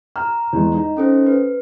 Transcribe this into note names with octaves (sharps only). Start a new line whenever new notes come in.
A#5 F6
E2 G#3
D#4
C#4 A4 C5
B4